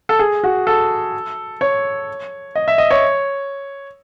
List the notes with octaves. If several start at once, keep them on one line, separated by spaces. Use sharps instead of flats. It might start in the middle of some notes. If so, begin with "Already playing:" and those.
A4
G#4
F#4
A4
C#5
D#5
E5
D#5
C#5